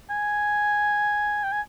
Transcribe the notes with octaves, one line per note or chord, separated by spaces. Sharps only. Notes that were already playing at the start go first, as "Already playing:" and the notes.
G#5
G5
G#5